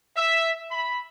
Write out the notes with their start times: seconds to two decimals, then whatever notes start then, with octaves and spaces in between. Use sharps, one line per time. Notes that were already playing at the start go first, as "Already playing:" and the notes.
0.17 E5
0.71 B5